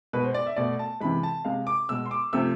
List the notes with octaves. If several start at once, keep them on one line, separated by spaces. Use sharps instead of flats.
B2 G#3 B4
C5
D5
E5
B2 A3 D5
A5
C3 E3 G#3 B5
A5
C3 G#3 F5
D6
B2 G#3 E6
C6
D6
C3 F3 A3 E6